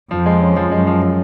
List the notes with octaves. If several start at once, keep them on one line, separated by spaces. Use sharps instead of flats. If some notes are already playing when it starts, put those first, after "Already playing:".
F2 F3
G#3
C#4
F3
F#2 G#3
F3
F3